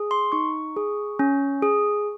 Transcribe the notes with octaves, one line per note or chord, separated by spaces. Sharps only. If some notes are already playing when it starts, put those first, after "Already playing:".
Already playing: G#4
C6
D#4 C#6
G#4
C#4
G#4